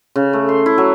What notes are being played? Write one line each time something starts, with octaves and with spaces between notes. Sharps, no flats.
C#3
A3
C6
E4
F#3